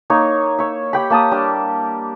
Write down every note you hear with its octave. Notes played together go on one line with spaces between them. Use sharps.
A#3 D#4 C#5
C#5 E5
G4 G5 B5
A#3 A5 D#6
G3 D4